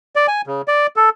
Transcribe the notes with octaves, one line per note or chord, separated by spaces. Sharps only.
D5
G#5
C#3
D5
A4